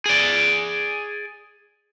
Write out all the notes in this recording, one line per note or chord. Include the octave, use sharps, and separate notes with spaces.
G#4 D5